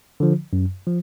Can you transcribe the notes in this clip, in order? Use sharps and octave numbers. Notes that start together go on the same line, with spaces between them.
D3 F3
F#2
F3